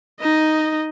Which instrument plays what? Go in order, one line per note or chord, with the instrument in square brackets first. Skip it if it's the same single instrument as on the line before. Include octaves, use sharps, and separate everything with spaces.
[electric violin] D#4 D#5